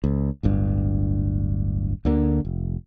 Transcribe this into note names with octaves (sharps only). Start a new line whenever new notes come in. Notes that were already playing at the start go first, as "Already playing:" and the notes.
C#2
D1 G1 G2
D2 D3 A#3
F1